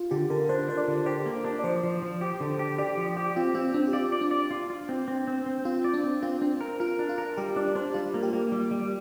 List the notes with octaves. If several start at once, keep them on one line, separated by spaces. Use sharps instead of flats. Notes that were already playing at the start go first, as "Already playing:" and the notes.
Already playing: F4
D3 G4
D3 A#4
D4 C5
D4 C5
D5
D3
G4 C5
A#3
D4
D5
F3 C5
F3
F3
G4
D3
G4
G4 D5
F3
G4 G5
C4 F4
C4 F4
C4 D4
G4
F4 D5
D5
D4
D5
F4
F4
C4
C4
C4
C4
C4 F4
D5
D4
C4
C4 F4
C4 D4
A#4
F4 A#4
D4
F4
A#4
G3 G4
D4 D5
D4 C5
G3 F4
A#3
G4
A#3
G3
G3